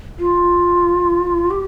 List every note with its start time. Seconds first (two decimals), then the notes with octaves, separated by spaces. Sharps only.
0.19 F4
1.50 G4